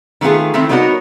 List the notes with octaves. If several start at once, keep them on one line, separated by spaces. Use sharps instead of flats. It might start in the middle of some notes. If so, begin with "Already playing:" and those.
D#3 A3 B3 F4 G#4
D#3 A3 C4 E4
G3 B3 D#4 F#4 A#4 C#5